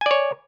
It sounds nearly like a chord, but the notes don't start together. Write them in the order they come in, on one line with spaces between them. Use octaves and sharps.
G#5 D5 C#5